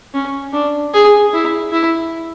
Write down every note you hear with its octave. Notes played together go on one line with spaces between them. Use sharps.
C#4
D4
G#4
E4
E4